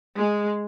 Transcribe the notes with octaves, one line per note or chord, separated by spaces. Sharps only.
G#3